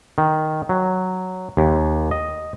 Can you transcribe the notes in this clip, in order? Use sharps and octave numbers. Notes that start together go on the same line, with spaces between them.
D#3
F#3
D#2
D#5